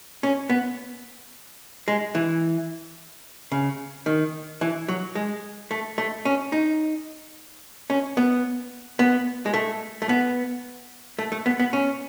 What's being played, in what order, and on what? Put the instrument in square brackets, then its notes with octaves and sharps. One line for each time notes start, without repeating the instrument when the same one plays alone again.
[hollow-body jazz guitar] C#4
B3
G#3
E3
C#3
D#3
E3
F#3
G#3
A3
A3
C#4
D#4
C#4
B3
B3
G#3
A3
A3
B3
A3
A3
B3
B3
C#4